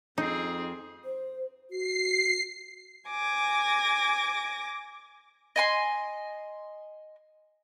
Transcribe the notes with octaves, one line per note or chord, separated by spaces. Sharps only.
F2 C4 D#4 G#4
C5
F#4 C7
G#5 D6 A#6
D#5 G#5 C6